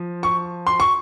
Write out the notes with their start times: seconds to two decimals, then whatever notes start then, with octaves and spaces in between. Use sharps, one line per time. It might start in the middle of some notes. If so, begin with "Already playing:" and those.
Already playing: F3
0.23 C#6
0.67 C6
0.80 C#6